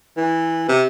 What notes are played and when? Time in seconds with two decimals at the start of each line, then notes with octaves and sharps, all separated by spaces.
0.17 E3
0.68 C3